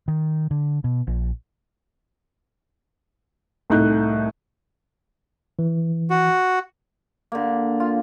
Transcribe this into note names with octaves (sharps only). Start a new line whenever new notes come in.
D#3
D3
B2
A#1
C2 A2 D#4 F#6 G6
E3
F#4
D3 A#3
F4